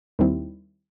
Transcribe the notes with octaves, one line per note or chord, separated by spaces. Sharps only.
D#2 D#3 G3 C4 E4